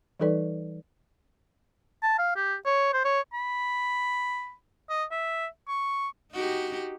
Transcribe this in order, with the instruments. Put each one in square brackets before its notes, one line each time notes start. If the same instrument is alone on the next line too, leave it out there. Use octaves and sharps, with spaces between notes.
[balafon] E3 G3 D#4 A4 B4 D5
[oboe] A5
F5
G4
C#5
C5
C#5
[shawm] B5
D#5
E5
C#6
[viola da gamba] D#4 F#4 G4